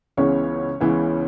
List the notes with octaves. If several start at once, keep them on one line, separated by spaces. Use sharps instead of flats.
C#2 C#3 E3 B3 C#4 C#5
C#2 C#3 E3 B3